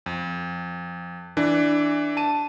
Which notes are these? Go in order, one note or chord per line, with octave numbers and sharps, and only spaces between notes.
F2
E3 D4
A5 D#7